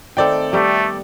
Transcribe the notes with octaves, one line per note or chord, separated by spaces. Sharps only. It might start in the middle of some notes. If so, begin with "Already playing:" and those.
D#3 A3 C4 A4 D5 G5
G3 A3 B3 G4